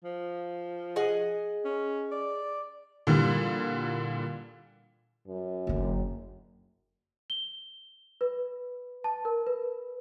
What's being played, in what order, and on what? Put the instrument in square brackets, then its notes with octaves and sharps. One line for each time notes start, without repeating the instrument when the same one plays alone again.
[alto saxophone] F3
[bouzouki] G#4 D#5 F#5
[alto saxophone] C#4
D5
[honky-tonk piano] A#2 D3 E3 G3
[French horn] F#2
[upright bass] F#1 D3
[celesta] G7
B4
A5
A#4
B4